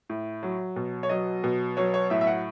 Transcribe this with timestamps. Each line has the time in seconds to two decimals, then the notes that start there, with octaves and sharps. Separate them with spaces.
0.10 A2
0.43 F#3
0.76 B2
1.03 C#5
1.09 F#3 D#5
1.44 B2
1.77 F#3 C#5
1.94 C#5
2.10 A2 E5
2.21 E5
2.27 F#5